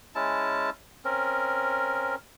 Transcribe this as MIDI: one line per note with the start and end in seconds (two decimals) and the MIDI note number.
0.15 0.70 56
0.15 0.70 61
0.15 0.70 64
0.15 0.70 81
1.05 2.15 60
1.05 2.15 61
1.05 2.15 70